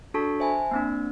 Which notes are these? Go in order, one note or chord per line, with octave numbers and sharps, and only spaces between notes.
D4 F#4 A4 A5 C#6 B6
C5 E5 G#5 A5 B5
A#3 C4 D4